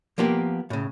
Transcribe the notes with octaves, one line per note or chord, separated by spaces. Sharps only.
F3 A#3 B3 G4 A#4
A2 C#3